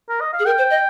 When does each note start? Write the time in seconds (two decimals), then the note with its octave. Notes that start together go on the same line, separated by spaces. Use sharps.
0.09 A#4
0.21 D#5
0.33 F5
0.39 G#4
0.46 A#4 G5
0.58 C5
0.70 D#5